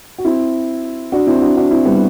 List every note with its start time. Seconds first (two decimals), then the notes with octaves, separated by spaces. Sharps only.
0.18 F#4
0.25 C4 E4
1.12 D4 F#4
1.27 C4 E4
1.42 D4 F#4
1.57 D4 F#4
1.71 C4 E4
1.85 G3 B3